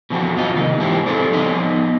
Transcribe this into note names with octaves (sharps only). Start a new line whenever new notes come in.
B2 E3 F3 C4 F#4
F#2 F4 D#5
C3 D#3 A#3 D#4
G#2 E3 E4 G4 C5
C4 A4 C5 D5
F3 B3 D#4 D#5